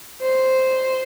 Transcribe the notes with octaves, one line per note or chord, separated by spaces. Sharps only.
C5